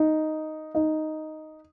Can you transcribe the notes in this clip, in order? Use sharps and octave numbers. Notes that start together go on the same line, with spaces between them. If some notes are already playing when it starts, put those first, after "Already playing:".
Already playing: D#4
D#4